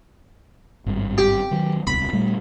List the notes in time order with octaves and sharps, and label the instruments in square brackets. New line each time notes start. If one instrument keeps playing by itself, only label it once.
[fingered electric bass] G#1 G2
[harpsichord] G4
[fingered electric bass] D#3 F#3
[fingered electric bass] D1 C2 [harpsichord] B5
[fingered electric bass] A#2 G3 A3